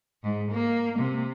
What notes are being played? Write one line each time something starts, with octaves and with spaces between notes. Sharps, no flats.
G#2
A#3
C3